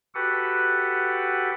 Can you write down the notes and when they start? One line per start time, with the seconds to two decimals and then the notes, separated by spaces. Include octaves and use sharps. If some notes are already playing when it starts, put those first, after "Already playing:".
0.15 F#4 G4 A4 B4 F#5